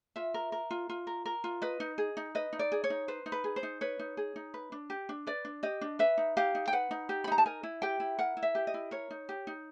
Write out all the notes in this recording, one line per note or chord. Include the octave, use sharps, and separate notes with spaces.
F4 E5
A#4
A#4
F4
F4
A#4
A#4
F4
B4 D#5
D#4
G#4
D#4
B4 D#5
D#4
D5
G#4
C#5
D#4
B4 C5
D#4
B4
G#4
C5
D#4
B4 C#5
D#4
G#4
D#4
B4
D4
G4
D4
B4 D5
D4
G4 D#5
D4
B4 E5
D#4
G4 F5
D#4
G5
B4 F#5
D#4
G4
B5
D#4 A#5
A5
A#4 G#5
E4
G4 G5
E4
A#4 F#5
E4
E5
G4
D#5
E4
A#4 C#5
D#4
G4
D#4